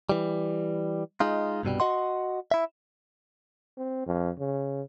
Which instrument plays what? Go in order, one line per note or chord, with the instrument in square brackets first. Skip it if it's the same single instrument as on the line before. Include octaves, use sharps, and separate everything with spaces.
[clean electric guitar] E3 G3
G#3 D#4 F4
C2 G2 B2 G3
F#4 D#5 F#5 C6
E4 E5
[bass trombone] C4
F2
C#3